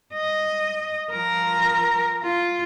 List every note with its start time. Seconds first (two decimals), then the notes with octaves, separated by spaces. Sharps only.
0.14 D#5
1.11 F3 A#4 A#5
2.23 F4